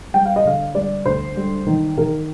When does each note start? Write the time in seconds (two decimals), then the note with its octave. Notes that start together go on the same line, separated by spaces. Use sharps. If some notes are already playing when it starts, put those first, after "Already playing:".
0.14 G3 G5
0.25 F5
0.36 D#5
0.45 D3 F5
0.75 G3 D5
1.06 D2 C5
1.37 G3
1.67 D#3
1.97 D#3 A#4